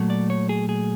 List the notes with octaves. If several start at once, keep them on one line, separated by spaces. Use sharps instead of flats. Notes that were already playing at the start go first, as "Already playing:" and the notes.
Already playing: A#2 F#3 A3
D5
C#5
G#4
G#4